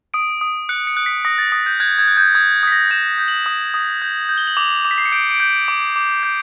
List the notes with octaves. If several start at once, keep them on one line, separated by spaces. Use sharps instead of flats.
D#6 D7
D#6
F#6 C#7
C#7
F#6
B6
D#6 A#6
A6
D#6
G6
F#6 G#6
G#6
F#6
G6
D#6 G#6
D#6 B6
A#6
G6 E7
G6
F#7
D#6
D#6
G6
G6
G7
F#7
D6 F7
D6
B6
C7
C#7
G6 D7
D7
G6
D7
D6
D6
G6